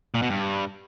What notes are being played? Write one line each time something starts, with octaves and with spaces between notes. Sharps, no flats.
A#2
B2
G2